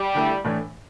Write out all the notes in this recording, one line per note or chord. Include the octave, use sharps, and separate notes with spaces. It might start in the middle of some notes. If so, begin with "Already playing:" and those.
Already playing: G3
D3 A3 E4
A2 E3 A3 D4